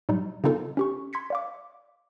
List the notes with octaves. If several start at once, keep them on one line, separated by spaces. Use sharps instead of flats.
A2 F#3 G3 D#4
C#3 B3 C4 D#4 F4 A4
C#4 G4 C#6
B5 C6 G#6 B6 C#7
D5 F5 D6